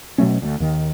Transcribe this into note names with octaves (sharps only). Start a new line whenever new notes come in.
B2 F#3 A3 C#4
D2 A3
D#2 D#3